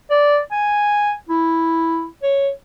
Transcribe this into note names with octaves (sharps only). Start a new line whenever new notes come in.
D5
G#5
E4
C#5